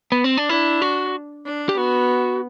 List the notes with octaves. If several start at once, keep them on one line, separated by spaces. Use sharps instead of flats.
B3
C4
D4
D4 E4
F#4
D4
G4
B3 F#4